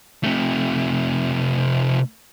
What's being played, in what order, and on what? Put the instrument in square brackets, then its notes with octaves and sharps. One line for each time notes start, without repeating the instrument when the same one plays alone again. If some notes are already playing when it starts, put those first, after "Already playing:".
[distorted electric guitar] C3 A3